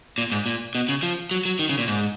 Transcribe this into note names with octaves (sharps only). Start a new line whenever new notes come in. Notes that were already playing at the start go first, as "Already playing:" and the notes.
A#2
G#2
A#2
B2
C#3
F3
F#3
F#3
D#3
C#3
A#2
G#2